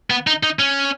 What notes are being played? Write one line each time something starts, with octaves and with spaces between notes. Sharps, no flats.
B3
D#4
D#4
C#4